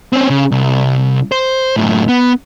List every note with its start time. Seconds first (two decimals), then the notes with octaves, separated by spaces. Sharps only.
0.13 C4 C#4
0.30 C#3
0.51 C2
1.32 C5
1.76 F#2 A2
2.08 B3